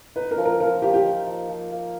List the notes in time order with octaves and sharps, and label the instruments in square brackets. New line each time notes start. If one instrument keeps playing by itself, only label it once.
[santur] D#4 [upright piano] B4
[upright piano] A#4
[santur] F3
[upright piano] A#4
[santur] F3 [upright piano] A#4
[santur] A#3 [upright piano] G4
[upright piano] G4
[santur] D#4
F3
F3
A#3